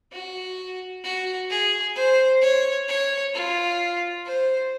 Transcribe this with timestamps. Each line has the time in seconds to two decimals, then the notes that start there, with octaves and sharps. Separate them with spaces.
0.13 F#4
1.04 F#4
1.50 G#4
1.96 C5
2.42 C#5
2.88 C#5
3.34 F4
4.27 C5